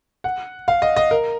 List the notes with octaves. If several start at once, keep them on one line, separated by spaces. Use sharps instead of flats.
F#5
F5
D#5
D#5
A#4